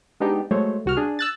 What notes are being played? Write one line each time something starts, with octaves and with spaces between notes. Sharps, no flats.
G#3 B3 D4 D#4 G4
F#3 G#3 A3 C5 C#5
C2 F#4 F6
D4 G#4
E6 F#6 A6